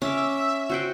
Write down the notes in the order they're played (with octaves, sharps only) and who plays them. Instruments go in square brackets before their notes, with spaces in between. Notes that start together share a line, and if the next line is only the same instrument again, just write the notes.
[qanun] C#4 D6 [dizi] E5
[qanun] F#4 C5 G5